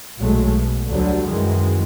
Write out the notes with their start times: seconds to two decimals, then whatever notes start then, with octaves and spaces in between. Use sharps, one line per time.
0.17 B1 A#2 F#3 G#3 A3
0.51 B2
0.89 D2 D3 F#3 G3
1.28 F#2 D#3 E3 G#3